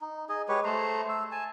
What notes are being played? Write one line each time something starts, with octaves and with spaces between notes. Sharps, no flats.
D#4
G#4 D#5
G#3 G4 B4 C#5
A3 C5 A#5
E6
G#5 A5